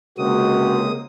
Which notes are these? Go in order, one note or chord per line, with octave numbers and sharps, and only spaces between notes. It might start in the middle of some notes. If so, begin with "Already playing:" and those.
C#2 C3 G#3 A#3 F#4 D#6